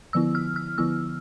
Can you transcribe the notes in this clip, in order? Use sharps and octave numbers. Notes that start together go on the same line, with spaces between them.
D3 F3 B3 E4 E6
F6
F6
D3 F3 B3 E4 E6